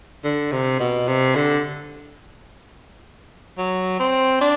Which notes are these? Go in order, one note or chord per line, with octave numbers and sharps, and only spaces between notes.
D3
C3
B2
C3
D3
F#3
C4
D4